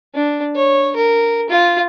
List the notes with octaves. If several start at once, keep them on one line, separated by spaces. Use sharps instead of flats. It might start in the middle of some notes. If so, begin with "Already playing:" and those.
D4
C#5
A#4
F4